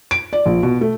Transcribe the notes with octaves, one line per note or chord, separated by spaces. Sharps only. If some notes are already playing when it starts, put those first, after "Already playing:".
D7
D5
A#1
B2
A3